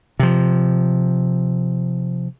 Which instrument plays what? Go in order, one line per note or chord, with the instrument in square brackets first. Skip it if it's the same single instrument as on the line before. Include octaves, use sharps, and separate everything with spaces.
[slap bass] C3 F3